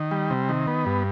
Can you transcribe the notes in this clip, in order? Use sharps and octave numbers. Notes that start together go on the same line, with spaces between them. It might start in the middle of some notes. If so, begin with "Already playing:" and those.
Already playing: D#3
G3
C3
D#3
B3
G2